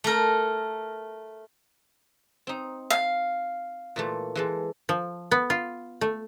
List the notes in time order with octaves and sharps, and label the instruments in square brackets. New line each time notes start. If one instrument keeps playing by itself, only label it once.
[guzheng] A3 A#4
C4 D#4
[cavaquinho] F5
[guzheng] A#2 E3 A3
E3 G#3 A4
[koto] F3
B3
F4
A3